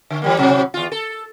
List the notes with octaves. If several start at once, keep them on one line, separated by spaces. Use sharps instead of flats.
D3
E3 G3 A#3
A2 C3 F#3
E2 F4
A4